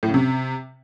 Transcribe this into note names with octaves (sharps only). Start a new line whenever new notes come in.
A2
C#3
C3